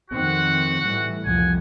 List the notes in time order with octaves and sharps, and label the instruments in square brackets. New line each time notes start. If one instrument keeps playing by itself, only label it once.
[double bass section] F2 D#3 C4 [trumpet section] F#4 F#5
[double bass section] A2 E3 G3
[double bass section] C2 F2 F3 [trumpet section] F#5 G#5